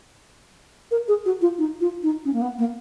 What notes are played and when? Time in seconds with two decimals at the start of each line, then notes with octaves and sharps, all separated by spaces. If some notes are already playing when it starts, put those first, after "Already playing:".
0.91 A#4
1.08 G#4
1.25 F#4
1.41 F4
1.58 D#4
1.80 F4
2.03 D#4
2.25 C#4
2.33 A#3
2.41 B3
2.58 A#3